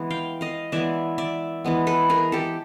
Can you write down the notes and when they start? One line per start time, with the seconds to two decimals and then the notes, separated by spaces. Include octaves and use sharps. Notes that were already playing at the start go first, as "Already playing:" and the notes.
Already playing: E3 G#3 B3
0.10 F5 G5
0.41 D#5 F5
0.72 E3 G#3 B3 D5 E5
1.18 D5 E5
1.65 E3 G#3 B3
1.87 A4 B4
2.10 G#4 A#4
2.32 G4 A4